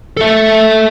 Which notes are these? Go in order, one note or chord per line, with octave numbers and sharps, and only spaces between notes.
A4 E5